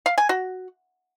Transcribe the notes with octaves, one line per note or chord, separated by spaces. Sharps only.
F5
G#5
F#4